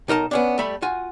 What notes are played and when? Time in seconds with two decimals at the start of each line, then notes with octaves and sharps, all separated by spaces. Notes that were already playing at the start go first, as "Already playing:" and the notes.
0.08 B1 D#4 A#4 A5
0.31 B3 C#4 D4
0.59 G3 A3 E5 B5
0.82 F4 F#4 G#5